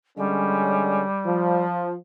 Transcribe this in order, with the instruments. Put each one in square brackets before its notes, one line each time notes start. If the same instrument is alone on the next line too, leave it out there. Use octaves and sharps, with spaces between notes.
[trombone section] D3 G#3 C#4 [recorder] G3
[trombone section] F3